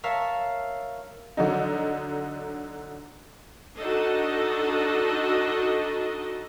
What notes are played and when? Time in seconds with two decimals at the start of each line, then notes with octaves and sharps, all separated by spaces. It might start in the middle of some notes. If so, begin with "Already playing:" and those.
0.03 A#4 C#5 E5 F5 A5
1.37 D3 F#3 D#4
3.78 D4 D#4 F#4 A4 D#5